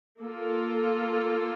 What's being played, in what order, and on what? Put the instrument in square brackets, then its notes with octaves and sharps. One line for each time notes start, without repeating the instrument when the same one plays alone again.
[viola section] A#3 F4 A4